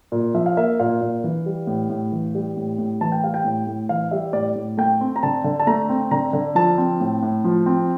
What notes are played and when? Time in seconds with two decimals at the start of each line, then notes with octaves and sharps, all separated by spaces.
0.12 A#2
0.35 F3 E5
0.46 F5
0.57 A#3 E5
0.80 A#2 F5
1.01 A#2
1.24 E3
1.46 G3
1.67 A2
1.90 A2
2.12 E3
2.35 G3
2.57 A2
2.78 A2
3.01 E3 A5
3.12 G5
3.23 G3 F5
3.34 G5
3.45 A2
3.67 A2
3.89 E3 F5
4.11 G3 E5
4.33 A2 D5
4.56 A2
4.77 A3 G5
5.01 C4
5.16 A#5
5.23 D3 A5
5.44 D3
5.60 A5
5.67 A3 A#5
5.89 C4
6.11 D3 A#5
6.33 D3
6.55 F3 A5
6.78 C4
7.00 A2
7.23 A2
7.44 F3
7.66 C4